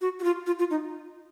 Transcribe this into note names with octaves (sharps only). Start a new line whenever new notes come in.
F#4
F#4
F4
F4
F4
D#4